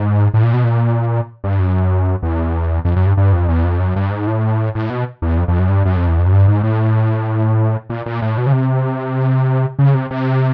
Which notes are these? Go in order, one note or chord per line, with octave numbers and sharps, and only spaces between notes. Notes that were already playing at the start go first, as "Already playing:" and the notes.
Already playing: G#2
A2
A#2
B2
A#2
G2
F#2
E2
F2
F#2
G2
G2
F2
E2
F2
F#2
G2
G#2
A2
A2
B2
E2
F2
F2
F#2
G2
F#2
F2
E2
F2
F#2
G2
G#2
A2
A#2
A#2
A2
B2
C#3
C3
C#3
C3
C3